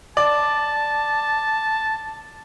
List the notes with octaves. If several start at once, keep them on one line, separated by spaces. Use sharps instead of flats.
D5 A5